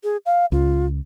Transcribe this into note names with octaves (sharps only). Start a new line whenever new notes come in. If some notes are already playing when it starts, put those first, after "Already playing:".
G#4
F5
C#2 F4